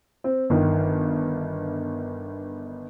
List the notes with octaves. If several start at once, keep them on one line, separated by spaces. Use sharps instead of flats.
C4
G1 D#3